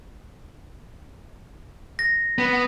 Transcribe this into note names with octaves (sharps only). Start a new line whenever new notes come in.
A#6
B3